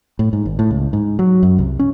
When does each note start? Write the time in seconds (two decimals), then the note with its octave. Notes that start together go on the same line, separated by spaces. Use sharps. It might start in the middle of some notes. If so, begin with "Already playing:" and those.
0.19 A2
0.33 G#2
0.46 G#1
0.59 A2
0.70 C#2
0.93 G#2
1.19 F#3
1.43 F#2
1.59 C2
1.79 C#4